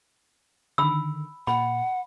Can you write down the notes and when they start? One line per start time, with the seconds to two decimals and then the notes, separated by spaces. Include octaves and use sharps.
0.78 D3 D#3 B5 E6
1.47 A#2 F#5 B5